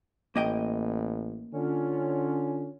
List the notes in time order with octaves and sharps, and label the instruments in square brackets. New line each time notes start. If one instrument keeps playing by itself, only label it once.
[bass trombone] A1 [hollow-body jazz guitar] A#3 D#5 G5
[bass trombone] D3 [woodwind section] C#4 F4